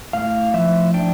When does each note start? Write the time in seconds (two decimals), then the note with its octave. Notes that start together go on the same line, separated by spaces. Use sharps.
0.13 A2 F5
0.54 F3 E5
0.94 D4 G5